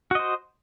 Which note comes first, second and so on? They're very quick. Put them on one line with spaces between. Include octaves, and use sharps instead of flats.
F#4 D#5 C5